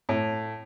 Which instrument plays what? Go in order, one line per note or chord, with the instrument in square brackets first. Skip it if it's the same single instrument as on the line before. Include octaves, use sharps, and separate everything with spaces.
[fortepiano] A2